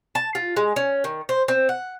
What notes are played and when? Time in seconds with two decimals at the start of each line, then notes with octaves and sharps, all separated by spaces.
0.15 A5
0.35 F4
0.57 G#3
0.76 C#4
1.04 D#3
1.29 C5
1.48 C4
1.69 F#5